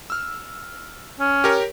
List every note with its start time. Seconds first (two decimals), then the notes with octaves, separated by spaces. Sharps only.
0.10 E6 F6
1.20 C#4
1.44 G4 A#4 C#5